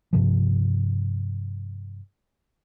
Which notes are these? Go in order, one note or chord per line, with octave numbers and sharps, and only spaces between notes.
G2 C3 F3